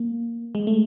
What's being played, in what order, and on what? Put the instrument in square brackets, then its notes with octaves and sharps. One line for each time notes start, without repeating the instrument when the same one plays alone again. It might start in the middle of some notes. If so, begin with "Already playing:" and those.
Already playing: [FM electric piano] A#3
G#3
A3